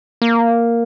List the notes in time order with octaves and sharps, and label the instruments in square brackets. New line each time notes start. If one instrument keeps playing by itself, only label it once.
[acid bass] A#3